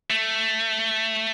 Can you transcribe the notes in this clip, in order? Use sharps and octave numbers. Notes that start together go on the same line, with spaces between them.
A3